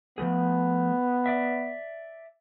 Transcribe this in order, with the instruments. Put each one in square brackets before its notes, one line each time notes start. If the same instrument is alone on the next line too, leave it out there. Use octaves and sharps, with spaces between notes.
[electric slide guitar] F3 A3 G#4 [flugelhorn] B3
[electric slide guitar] D5 E5